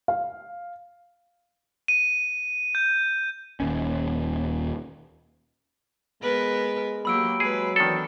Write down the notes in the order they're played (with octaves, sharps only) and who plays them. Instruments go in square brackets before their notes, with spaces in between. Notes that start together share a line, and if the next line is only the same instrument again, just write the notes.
[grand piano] F5
[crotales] D#7
G6
[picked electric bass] D#1 D#2 C#4
[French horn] G#3 [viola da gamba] B3 A#4 B4
[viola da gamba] F#3 A#3 G4 [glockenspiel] B5 E6 D7
[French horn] F#3 [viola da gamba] G#3 B4 [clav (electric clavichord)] G#4
[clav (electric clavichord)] D#3 A4 [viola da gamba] E3 B3 D4